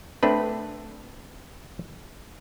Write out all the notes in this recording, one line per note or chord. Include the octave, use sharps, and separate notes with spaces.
A3 C4 D4 B4